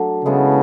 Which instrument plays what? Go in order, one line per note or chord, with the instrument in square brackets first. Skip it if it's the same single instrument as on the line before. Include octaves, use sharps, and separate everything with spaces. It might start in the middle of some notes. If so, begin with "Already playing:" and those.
Already playing: [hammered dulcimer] F#3 A3 D4
[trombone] C#3 [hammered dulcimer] G#3 B3 E4 A4